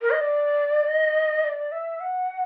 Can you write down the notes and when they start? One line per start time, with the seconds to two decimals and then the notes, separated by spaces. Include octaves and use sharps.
0.01 A#4
0.10 D#5
0.20 D5
0.86 D#5
1.44 D5
1.71 E5
2.00 F#5